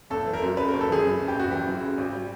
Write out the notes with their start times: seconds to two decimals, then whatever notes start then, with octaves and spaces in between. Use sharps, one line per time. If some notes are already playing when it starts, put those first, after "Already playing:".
0.10 F#1 A4
0.26 E3
0.33 A#4
0.42 F#2
0.57 C#3 B4
0.69 A#4
0.74 F#1
0.81 A4
0.89 E3 G#4
1.04 F#2
1.19 C#3
1.28 G4
1.36 F#1 F#4
1.51 E3 G4
1.66 F#2
1.82 C#3
1.98 G#1
2.13 G3